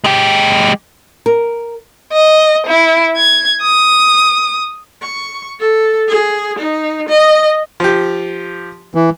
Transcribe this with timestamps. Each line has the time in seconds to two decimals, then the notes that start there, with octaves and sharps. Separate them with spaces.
0.04 G#3 G4
1.26 A#4
2.13 D#5
2.67 E4
3.17 G#6
3.62 D#6
5.02 C#6
5.60 A4
6.08 G#4
6.59 D#4
7.09 D#5
7.80 F3 G4
8.95 E3